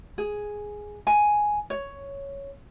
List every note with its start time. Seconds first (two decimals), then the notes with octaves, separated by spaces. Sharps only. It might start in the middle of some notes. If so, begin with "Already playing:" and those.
0.18 G#4
1.07 G#5
1.70 C#5